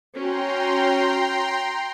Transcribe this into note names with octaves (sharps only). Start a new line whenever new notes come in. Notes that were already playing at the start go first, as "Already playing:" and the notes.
C#4 F#4 G5 A#5 C6